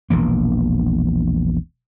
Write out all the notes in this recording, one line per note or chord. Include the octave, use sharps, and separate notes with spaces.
E1 A#1 E3 A#3